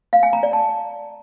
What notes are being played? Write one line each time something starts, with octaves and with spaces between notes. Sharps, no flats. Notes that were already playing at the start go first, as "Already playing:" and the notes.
F5
G#5
A#5
D5
A5